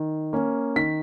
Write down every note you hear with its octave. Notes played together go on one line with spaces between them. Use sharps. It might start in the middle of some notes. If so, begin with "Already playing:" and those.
Already playing: D#3
A#3 C#4
D#3 B6